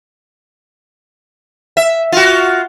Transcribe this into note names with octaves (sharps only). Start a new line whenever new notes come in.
E5
F4 F#4